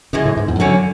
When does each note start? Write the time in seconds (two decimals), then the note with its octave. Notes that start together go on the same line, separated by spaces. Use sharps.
0.13 F#2 C#3 E3 G#3
0.25 A2
0.37 G#2
0.48 E2
0.59 F#2 D3 F#3 C#4